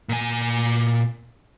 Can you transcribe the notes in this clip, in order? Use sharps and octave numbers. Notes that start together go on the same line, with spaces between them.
A#2 G#5